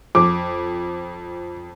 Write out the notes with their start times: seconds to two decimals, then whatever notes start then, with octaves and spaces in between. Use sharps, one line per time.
0.15 F2 D6